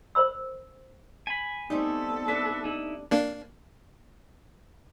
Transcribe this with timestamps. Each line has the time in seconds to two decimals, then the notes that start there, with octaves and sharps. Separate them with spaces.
0.15 A#4 C5 B5 E6
1.27 G#5 B5
1.70 G3 A3 B3 C4 D#4 A4
2.28 D4 B4 E5
2.64 D#4 E4
3.11 A#3 D4